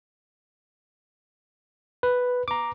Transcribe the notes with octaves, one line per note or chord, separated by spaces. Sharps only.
B4
A#5 D6